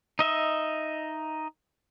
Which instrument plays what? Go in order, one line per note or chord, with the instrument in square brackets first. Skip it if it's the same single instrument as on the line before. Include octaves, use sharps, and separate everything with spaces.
[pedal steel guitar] D#4 D#5 E5